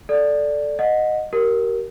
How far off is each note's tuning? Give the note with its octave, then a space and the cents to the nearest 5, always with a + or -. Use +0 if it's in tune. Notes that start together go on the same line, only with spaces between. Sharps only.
A4 +0 D5 +0
D#5 -10 F#5 -15
G4 -35 A#4 +0